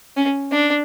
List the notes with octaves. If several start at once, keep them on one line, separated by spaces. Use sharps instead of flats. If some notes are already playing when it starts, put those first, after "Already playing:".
C#4
D4